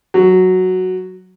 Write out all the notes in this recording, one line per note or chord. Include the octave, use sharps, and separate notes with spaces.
F#3